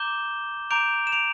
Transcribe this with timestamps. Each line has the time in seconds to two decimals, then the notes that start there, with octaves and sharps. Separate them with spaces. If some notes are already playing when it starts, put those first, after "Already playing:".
Already playing: A#5 D6 G6 E7 G7
0.70 A#5 D6 G6 D7 F7
1.07 E7
1.12 D7 F7